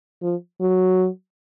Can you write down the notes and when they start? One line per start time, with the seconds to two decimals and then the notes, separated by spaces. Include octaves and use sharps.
0.22 F3
0.61 F#3